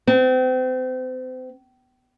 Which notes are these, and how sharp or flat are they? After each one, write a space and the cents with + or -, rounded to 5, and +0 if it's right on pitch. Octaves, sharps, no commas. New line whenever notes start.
C4 -35